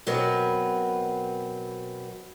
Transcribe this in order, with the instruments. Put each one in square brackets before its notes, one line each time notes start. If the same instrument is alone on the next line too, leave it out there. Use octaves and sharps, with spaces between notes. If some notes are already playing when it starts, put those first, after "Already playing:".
[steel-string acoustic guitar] B2 F#3 B3 C4 A#4 B4